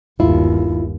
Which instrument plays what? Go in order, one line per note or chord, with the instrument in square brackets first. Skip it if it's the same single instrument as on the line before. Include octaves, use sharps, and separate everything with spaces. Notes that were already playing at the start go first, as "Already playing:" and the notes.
[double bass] G1 D#2 [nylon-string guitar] E4 F4